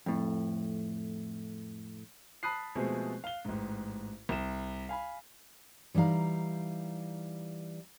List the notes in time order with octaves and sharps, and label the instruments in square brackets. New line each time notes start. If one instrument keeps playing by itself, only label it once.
[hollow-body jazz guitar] F2 A2
[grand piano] A5 B5 D#6 F#6 C7
B2 F3 G#3 A3 C4 G#4
F5 G7
A1 G#2
C2 E7
F5 G#5 B5
[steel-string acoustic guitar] E3 G3 D#4 F5 A#5